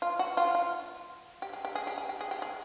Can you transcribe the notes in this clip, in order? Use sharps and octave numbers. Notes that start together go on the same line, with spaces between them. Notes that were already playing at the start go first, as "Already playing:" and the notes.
F4
F#4
F4
F4
G4
G#4
G4
G#4
G4
G#4
G4
G#4
G4
G#4